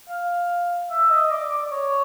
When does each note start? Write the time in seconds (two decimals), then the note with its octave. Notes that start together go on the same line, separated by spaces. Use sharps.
0.09 F5
0.90 E5
1.10 D#5
1.31 D5
1.52 D5
1.72 C#5